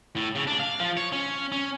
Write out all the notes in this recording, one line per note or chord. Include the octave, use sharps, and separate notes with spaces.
A2
C#3
D4
F5
F3
C#5
C#4
C#4